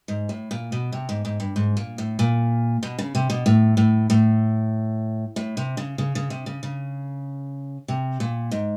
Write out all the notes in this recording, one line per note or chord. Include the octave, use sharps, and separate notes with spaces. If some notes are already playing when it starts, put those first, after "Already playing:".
G#2
A2
A#2
B2
C3
G#2
G#2
G2
G#2
A#2
A2
A#2
B2
C#3
C3
B2
A2
A2
A2
A2
C3
C#3
C#3
C#3
C3
C#3
C#3
C3
A#2
G#2